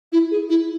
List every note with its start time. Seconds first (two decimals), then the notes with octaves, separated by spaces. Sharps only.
0.12 E4
0.31 G#4
0.50 E4